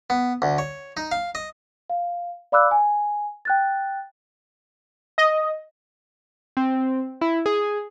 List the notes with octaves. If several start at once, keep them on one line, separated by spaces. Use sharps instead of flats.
B3
D2
C#5
D#4
F5
D#5
F5
D5 F5 B5 D6 E6 F#6
G#5
G5 F#6 A6
D#5
C4
E4
G#4